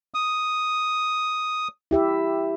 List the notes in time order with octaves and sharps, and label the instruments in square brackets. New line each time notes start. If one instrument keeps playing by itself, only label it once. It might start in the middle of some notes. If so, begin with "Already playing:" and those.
[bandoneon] D#6
[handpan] E4 G4 E5